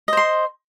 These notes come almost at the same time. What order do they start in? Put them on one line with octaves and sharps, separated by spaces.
D#5 C5 C6